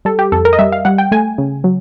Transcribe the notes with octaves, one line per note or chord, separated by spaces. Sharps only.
G3 A4
G4
F2 A4
A#4
D#5
G3 E5
F5
G3 F#5
G5
A3 G#5
C#3
F#3